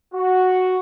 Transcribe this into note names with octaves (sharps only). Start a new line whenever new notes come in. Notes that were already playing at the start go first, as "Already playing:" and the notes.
F#4